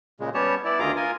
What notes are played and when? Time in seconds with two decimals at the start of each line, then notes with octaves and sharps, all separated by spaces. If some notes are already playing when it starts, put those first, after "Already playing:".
0.20 A#2 C#3 G#3
0.34 G3 B3 C#4 G4 C#5 A5
0.65 B3 E4 D5
0.79 D2 D#3 F4 G#4 A#5 D6
0.96 F4 A#4 G#5